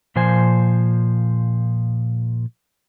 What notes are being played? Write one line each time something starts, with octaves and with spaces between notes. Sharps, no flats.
A#2 F3 C5 G#5